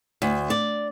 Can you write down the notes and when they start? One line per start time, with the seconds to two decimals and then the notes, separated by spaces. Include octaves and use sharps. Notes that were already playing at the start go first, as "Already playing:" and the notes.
0.22 D2
0.50 D5